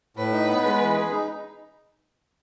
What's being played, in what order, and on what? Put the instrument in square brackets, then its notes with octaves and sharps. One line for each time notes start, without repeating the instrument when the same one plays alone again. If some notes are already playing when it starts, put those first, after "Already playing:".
[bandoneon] A2 [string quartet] B4
[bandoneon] D#4
B3
G#3
E3
G#4
D#4